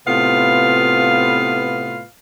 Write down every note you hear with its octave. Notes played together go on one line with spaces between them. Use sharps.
A2 C3 B3 F4 B4 F5